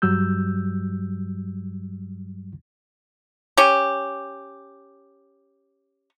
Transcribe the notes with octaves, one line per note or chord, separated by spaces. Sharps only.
G2 F#3 G3 E6 G6
C#4 G4